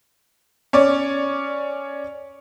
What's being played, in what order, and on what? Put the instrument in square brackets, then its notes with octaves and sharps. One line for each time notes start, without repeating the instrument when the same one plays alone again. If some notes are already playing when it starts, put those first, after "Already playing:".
[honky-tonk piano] C#4 C#5 D5